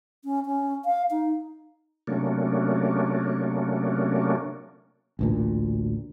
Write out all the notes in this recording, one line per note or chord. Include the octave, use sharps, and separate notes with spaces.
C#4
C#4
F5
D#4
C3 F#3 A3 A#3 C#4 D4
A1 D2 A#2